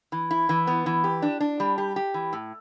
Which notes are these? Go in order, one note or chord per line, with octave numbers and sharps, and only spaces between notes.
E3
E4
E3
B3
E3
G4
D4
D4
G3
G4
G4
E3
A2